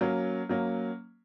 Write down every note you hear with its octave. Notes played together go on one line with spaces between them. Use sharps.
F#3 A#3 C#4
F#3 A#3 C#4